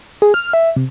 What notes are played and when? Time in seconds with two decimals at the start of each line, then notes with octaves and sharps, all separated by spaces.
0.22 G#4
0.34 F6
0.53 E5
0.76 C3